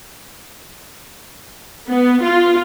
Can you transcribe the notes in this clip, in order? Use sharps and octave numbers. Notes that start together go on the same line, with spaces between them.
B3
F4